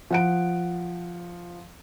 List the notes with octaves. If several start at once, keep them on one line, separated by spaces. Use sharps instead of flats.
F3 F#5 D7